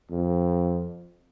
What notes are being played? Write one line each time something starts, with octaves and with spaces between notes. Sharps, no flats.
F2